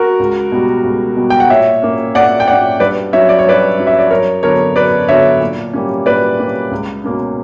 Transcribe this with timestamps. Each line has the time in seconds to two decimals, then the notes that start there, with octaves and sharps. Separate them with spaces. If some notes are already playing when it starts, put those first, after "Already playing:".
Already playing: F#4 A#4
0.19 C#2
0.52 B2 G3
0.84 C#2
1.17 B2 G3
1.30 G5
1.40 F#5
1.50 A#2 C#5 E5
1.82 A#3 C#4
2.15 A#2 D5 F#5
2.40 G5
2.47 A#3 C#4 D5 F#5
2.80 G2 B4 D5
3.13 F#3 C#4 C#5 E5
3.29 D5
3.39 C#5
3.46 G2 B4 D5
3.79 F#3 C#4
3.87 E5
3.99 D5
4.10 F#2 A#4 C#5
4.43 D3 F#3 B3 A#4 C#5
4.75 F#2 B4 D5
5.08 D3 F#3 B3 C#5 E5
5.41 A#2
5.73 G3 A#3 C#4
6.06 A#2 B4 D5
6.39 G3 A#3 C#4
6.71 C#2
7.04 B2 A#3 C#4